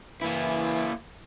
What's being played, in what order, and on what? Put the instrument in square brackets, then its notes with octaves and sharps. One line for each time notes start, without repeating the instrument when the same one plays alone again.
[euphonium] E3 [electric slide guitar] A#3 E4